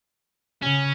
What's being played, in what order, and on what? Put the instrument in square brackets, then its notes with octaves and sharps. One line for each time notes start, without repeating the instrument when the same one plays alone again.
[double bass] C#3 [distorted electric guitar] C#4